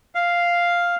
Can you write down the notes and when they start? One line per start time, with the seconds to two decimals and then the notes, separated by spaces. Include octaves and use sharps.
0.15 F5